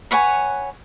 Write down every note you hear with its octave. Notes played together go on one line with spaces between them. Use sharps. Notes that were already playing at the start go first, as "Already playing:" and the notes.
B4 C#5 F#5 G#5